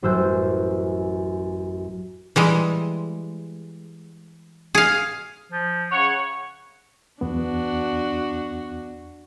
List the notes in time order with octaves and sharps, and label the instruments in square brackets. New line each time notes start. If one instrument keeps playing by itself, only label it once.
[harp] A1 F#2 C5 E6 F#6 G6
[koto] E3 G3 G#3
G#4 F5
[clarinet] F3
[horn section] C#3 C#5 [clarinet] F#5
[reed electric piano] E2 B3 [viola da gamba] D4 F#4